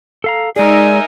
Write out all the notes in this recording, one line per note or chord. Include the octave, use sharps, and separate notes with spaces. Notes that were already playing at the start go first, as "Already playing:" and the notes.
A4 F5 A#5
G#3 D#4 G#4 A#4 D5 E5 G#5